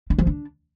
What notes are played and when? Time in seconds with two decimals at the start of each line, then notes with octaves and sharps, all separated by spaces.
0.10 D4
0.18 F3
0.27 D4